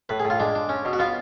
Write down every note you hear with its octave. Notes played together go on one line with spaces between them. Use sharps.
A2 B4
G#4
A2
F4
G#3 D4
D4
C#4
B2
F#4
B3 F4